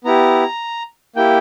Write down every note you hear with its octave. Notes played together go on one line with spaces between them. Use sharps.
B3 E4 G4 A#5
A#3 E4 G4 G5